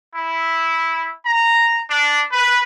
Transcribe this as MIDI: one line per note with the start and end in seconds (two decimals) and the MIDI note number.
0.16 1.08 64
1.26 1.80 82
1.89 2.22 62
2.33 2.62 71